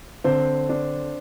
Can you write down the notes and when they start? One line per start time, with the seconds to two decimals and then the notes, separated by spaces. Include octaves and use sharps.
0.24 D3 C4 C5
0.69 D4